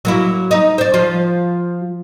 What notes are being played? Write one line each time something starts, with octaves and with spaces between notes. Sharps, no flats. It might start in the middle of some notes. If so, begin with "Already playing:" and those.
F#3 A#3 E4
D#4
C5 D5
F3 F4